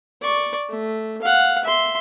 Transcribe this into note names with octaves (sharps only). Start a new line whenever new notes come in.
D5 C#6
A3
F5 F#5
E5 C6